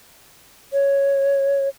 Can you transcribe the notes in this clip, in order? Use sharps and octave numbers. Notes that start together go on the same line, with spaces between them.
C#5